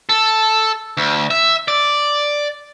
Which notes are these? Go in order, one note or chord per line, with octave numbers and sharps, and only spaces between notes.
A4
D2
E5
D5